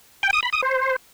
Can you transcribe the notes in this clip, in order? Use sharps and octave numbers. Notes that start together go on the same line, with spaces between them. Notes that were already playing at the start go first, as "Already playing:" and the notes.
G5
D#6
B5
D#6
C5